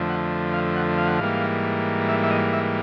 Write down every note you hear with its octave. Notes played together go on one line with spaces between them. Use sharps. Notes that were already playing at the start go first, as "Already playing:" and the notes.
Already playing: F2 D3 F3 A3
F#5
F5
F#5
F5
F#5
G#2 E3 G3 A#3 F5
E5
E5
D#5
E5